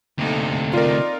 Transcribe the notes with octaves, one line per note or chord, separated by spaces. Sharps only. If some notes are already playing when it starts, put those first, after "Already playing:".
D2 C3 A#3 D#4 A4
C4 D#4 F4 A#4 D5